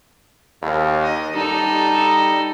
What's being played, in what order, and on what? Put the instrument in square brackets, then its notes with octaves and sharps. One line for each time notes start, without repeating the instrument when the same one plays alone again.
[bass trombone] D#2
[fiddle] D#5
[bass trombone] G3 [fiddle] D#4 A4